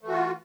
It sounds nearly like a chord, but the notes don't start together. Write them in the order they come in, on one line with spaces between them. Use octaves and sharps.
A3 E3 F#4 F4